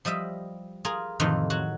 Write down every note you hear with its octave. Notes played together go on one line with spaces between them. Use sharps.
F3 G3 D#5 E5
F4 G#4 A#4
F2 A2 C3 D#3 E3 F4
F#3 F#4